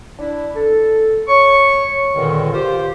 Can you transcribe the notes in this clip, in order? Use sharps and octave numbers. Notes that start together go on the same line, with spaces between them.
D4 E4
A4
C#5 C#6
C#2 G2 A#2 D3 D#3
F4 G4 C5